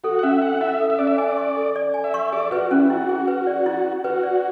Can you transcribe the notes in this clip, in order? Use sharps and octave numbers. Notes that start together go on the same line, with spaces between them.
F#4 A4
F#5
C#4 E5
C#4 F#5
E4 E5
A4
E5
C#4 D5
E5
D5 G#5
C#6
A4
D5
G#5
E5
C#6
G#4 D5
F#4 B4
C#4 E4
E4 F#4
G#4
B4
D5
E4
E4
F#4 B4
D5